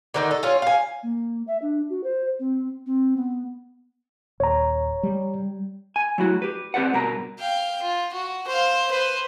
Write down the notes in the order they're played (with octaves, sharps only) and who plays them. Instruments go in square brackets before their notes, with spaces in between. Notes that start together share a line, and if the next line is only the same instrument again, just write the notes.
[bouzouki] D3 D#3 D#4
A4
C#4 F4 C#5
F5 G#5
[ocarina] A#3
E5
D4
F#4
C5
C4
C4
B3
[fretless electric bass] D#1 [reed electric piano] C#5 A#5
[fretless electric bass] G3
[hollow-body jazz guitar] G#5
F#3 A3 E4 F#4
G4 B4
C4 G4 B4 D5 F#5
G2 B2 A#4 B4 A#5
[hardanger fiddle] F5 G5
F4
F#4
C5 F5
B4 C5